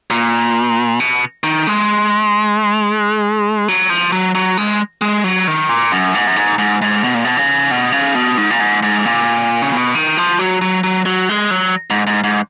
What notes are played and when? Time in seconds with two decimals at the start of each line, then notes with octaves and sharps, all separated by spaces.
0.10 A#2
1.00 B2
1.43 D#3
1.67 G#3
3.68 F#3
3.90 F3
4.12 F#3
4.35 F#3
4.57 G#3
5.01 G#3
5.24 F#3
5.47 D#3
5.69 A#2
5.92 F#2
6.15 G#2
6.27 F#2
6.36 G#2
6.58 G#2
6.82 G#2
7.04 B2
7.14 A#2
7.25 B2
7.37 C#3
7.71 B2
7.92 C#3
8.15 B2
8.38 G#2
8.51 A#2
8.60 G#2
8.83 G#2
9.05 A#2
9.62 C#3
9.72 B2
9.95 D#3
10.17 F3
10.39 F#3
10.61 F#3
10.84 F#3
11.06 F#3
11.29 G#3
11.51 F#3
11.90 G#2
12.07 G#2
12.24 G#2